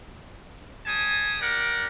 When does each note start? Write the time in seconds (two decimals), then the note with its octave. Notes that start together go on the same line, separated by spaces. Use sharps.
0.86 G3 G#5 A5 D#6
1.40 G4 A#4 D5 F#5